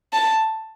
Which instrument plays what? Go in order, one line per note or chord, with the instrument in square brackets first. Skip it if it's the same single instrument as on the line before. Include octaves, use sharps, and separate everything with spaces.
[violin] A5